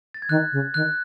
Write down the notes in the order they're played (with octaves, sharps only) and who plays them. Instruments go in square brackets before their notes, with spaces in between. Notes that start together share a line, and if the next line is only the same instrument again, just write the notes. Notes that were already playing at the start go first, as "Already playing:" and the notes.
[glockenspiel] A6
G#6
[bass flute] D#3 [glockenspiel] F#6
[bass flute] C#3
[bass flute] D#3 [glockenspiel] F#6